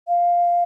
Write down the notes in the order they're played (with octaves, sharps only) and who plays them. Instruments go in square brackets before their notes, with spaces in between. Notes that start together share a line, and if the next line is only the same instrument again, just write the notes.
[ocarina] F5